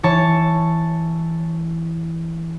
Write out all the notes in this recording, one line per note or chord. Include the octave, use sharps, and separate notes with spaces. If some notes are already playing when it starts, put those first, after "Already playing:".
E3 C#5 A5